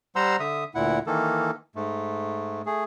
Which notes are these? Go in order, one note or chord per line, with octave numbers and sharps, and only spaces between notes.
G3 C5 F#5 A#5 C6 E6
D3 E5 D#6
D2 A#2 E4 F#5
D#3 E3 A#3 A4
G#2 A3
A3 G#4